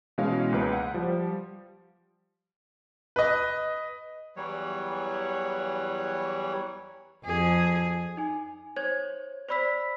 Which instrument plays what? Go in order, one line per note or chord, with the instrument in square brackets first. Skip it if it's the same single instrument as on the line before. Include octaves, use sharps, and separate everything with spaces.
[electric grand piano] B2 E3 G#3 C#4 C#5 F5
C#2 A#3 B4
F#5
F3 G3
[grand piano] B4 D#5
[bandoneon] E2 E3 F#3 G3 C#5
[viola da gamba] F2 G#4
[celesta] D#4 G#5
C5 C#5 G#6
C5 D5 B5 E6 B6